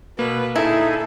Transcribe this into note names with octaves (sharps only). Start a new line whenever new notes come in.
B2 A#3 B4
A#2 D3 D#4 E4 G#4 A4 E5